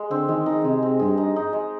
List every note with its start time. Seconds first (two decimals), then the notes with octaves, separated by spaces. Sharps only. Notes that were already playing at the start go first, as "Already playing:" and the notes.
Already playing: G#3
0.10 D3 C4
0.29 D#3 G#3
0.46 D#3 D#4
0.64 C3 G#3
0.83 C4
0.99 G2 G#3
1.18 D#4
1.36 D#4
1.53 G#3